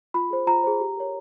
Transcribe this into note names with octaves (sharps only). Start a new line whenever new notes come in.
F4 B5
G#4 C5
F4 A#5
G#4 C5
G4
A#4 C#5